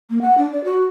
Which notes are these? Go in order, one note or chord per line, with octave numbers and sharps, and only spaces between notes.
A#3
F#5
D4
D5
F#4